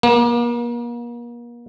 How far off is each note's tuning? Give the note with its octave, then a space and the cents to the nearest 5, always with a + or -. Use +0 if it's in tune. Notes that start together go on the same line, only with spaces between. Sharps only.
A#3 +40